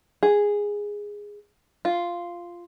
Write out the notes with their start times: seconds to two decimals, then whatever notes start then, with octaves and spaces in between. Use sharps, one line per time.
0.23 G#4
1.85 F4